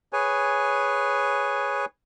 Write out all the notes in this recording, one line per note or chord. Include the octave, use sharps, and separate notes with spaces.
G#4 B4 C#5 G#5